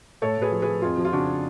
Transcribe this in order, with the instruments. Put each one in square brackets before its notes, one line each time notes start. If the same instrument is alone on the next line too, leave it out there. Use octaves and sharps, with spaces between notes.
[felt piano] A2 A4 C#5
A2 G#4 B4
F3
G#4 B4
F3
F2 F4 G#4
F3
F4
C#3 D4 F#4